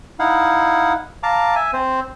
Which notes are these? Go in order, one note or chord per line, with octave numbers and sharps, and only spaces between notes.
D#4 E4 F5 F#5
F5 A5 A#5 D6
E5 G#5
C4 C5